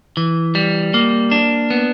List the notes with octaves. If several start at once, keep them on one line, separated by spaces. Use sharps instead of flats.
E3
G3
A#3
D4
B3